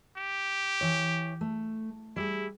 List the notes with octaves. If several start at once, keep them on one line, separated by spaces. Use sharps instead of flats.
G4
E3 C#5
A3
G3 E4 G#4